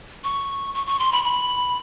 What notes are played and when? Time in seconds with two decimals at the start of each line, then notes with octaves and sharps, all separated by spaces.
0.24 C#6
0.74 C#6
0.87 C#6
0.99 C6
1.12 B5
1.24 B5